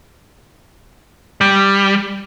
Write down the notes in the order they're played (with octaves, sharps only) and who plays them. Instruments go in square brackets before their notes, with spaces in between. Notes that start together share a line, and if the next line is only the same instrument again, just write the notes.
[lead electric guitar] G3